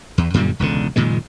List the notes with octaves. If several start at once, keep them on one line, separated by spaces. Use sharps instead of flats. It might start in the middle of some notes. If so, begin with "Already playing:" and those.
E2
F#2 A#2 D3 G3
E1 C#2 B2 D3
F#1 A#2 D#3 G#3